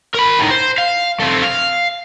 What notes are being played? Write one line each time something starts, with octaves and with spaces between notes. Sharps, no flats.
A#4 B5
A2 D#4
C5
F5
A3 C4
F5